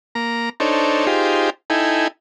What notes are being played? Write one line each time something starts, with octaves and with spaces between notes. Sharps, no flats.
A#3 A#5
D4 D#4 A4 C5 C#5
D#4 F4 G4 G#4 C5
D#4 E4 A4 G5 G#5